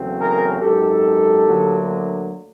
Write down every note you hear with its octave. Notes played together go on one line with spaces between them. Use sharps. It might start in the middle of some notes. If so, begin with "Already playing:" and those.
Already playing: E2 C#3 F#3 A3 C4
G#4 A#4
G#1 F#2 D#3 G4 A4
D2 D3 F#3 A#3